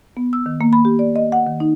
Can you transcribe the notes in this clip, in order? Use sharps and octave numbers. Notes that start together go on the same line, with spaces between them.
B3
E6
D#3
A#3
B5
G4
D5
D#5
F#5
D#3
D#4